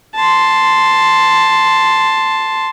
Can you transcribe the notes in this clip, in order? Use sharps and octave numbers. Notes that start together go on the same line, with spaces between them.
A5 C6